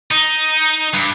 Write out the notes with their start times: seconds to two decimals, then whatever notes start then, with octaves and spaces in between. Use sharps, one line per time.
0.11 D#4
0.94 G2